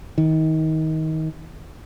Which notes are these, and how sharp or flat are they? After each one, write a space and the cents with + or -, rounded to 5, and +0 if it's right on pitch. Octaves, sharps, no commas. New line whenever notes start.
D#3 +25